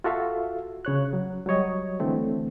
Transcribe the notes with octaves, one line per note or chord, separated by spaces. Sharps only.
F4 F#4 A4 E5 F5
C#3 C#5 F#6
F#3
F#3 G3 C#5 D#5
D3 E3 A3 C4